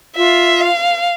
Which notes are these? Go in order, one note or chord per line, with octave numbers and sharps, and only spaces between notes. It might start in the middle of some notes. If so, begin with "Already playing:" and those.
F4 E5
F5